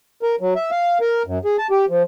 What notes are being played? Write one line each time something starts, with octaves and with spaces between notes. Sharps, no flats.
A#4
F#3
E5
F5
A#4
F#2
G#4
A5
G4
F3